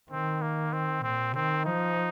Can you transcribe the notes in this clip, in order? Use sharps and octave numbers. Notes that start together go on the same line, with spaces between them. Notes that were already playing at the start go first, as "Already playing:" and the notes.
D#3 C4
A#3
C4
A#2 C4
D#3 C4
F3 D#4